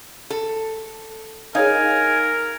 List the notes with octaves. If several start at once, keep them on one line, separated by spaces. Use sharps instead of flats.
A4
D#4 G#4 A#4 C#5 F5 G#5